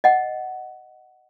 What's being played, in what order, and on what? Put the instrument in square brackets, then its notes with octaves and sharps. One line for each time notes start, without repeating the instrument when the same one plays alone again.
[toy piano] D#5 F#5